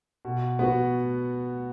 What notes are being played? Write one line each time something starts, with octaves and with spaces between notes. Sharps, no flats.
B2
B3 F#4